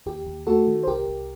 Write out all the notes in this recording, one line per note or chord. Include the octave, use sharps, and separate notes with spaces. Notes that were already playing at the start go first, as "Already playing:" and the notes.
D#2 G4
D#2
A3 F#4 A4
D#3
C5
C2 G4 A#4
C2